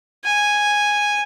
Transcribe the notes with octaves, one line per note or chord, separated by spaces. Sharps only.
G#5